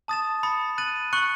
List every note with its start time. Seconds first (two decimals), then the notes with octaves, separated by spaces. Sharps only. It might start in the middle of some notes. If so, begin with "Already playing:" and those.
0.08 A5 D#6 A6 E7
0.43 B5 D#6 A6 C#7
0.78 F#6 A6 D#7 F#7
1.13 C#6 F#6 C#7 F#7